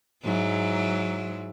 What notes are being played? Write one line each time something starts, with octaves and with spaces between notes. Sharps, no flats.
G#2 F#3 E4